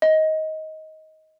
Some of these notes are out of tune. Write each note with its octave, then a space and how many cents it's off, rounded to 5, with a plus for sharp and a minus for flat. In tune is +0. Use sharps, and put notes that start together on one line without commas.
D#5 +15